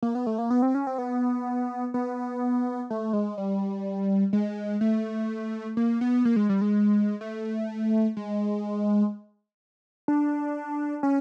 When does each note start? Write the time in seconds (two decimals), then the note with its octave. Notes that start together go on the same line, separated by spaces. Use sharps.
0.03 A#3
0.15 B3
0.27 A3
0.38 A#3
0.50 B3
0.62 C4
0.75 C#4
0.87 C4
0.98 B3
1.94 B3
2.90 A3
3.13 G#3
3.38 G3
4.33 G#3
4.81 A3
5.77 A#3
6.01 B3
6.25 A#3
6.36 G#3
6.49 G3
6.61 G#3
7.21 A3
8.17 G#3
10.08 D4
11.03 C#4